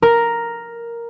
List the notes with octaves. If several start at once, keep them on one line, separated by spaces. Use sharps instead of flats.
A#4